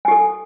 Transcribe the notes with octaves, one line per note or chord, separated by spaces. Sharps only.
G4 A4 G#5